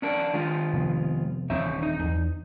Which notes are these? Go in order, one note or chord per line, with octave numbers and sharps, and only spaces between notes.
C#4 D4 A#4
D#3 G#3 F4
C3 F3 B3
D#1 E3 C4 C#4 D#4 E5
D#4
E2